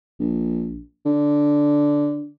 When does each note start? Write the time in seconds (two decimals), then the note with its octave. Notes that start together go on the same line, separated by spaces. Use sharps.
0.20 A#1
1.05 D3